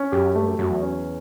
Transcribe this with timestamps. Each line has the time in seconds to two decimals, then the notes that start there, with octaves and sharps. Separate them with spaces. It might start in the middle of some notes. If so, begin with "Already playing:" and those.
Already playing: C#4
0.12 F#2 G4
0.35 G2 A3
0.47 F#2
0.59 F#2 F#3
0.71 E2
0.82 C#4